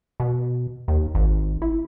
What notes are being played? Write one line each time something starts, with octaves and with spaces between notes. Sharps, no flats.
B2
D#2
G#1
E4